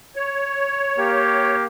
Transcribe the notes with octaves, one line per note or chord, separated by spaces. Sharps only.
C#5
A#3 G4